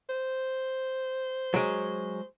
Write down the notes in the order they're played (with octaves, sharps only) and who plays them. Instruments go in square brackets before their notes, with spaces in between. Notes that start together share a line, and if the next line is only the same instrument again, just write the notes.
[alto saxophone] C5
[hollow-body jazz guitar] F#3 G#3